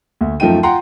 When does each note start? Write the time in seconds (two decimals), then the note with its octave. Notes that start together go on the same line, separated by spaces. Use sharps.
0.21 D2
0.40 F#2 F3 A3 D#4 G5 D#7
0.63 F4 F#5 G5 A#5 C6